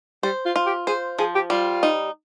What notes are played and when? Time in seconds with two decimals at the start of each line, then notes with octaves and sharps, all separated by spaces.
0.23 G3 C5
0.45 F4
0.56 F4
0.66 G4
0.87 G#4 C5
1.19 F3 G#4
1.35 G4
1.50 G3 F4
1.83 D#4